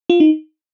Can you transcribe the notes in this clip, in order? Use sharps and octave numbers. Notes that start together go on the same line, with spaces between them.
F4
D#4